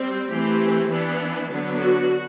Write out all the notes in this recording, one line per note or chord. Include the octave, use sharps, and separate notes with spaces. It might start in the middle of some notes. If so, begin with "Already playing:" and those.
Already playing: G3 C4
E3 A3 C4 G4
E3 B3 D4
D3 F#3 B3 D4
F#4